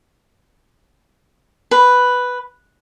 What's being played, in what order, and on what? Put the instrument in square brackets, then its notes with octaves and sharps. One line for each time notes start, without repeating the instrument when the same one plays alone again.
[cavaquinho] B4